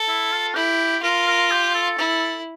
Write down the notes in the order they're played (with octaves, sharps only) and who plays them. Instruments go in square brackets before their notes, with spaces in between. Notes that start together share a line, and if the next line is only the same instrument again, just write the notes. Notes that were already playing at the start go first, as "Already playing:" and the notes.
Already playing: [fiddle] A4
[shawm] E4
F4
[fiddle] E4 [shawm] G4
[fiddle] F4 [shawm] A#4
[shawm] A#4
G4
A4
[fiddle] E4